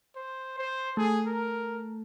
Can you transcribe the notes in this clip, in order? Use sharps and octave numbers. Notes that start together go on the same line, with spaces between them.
C5
C5
A3 G#4
A#4